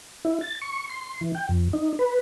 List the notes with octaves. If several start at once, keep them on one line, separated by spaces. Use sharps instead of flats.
E4
A6
C#6
C6
E3
G5
F2
D#4
B4